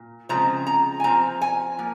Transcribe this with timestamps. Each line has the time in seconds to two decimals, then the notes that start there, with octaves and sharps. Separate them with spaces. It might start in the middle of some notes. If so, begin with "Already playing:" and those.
Already playing: A#2
0.29 C#3 F3 G#3 C4 A#5
0.67 A#5
1.00 G#5
1.04 F3 C4 A#5
1.41 G#5
1.79 F3 A#3